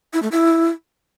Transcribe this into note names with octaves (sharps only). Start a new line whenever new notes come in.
E4
A3
E4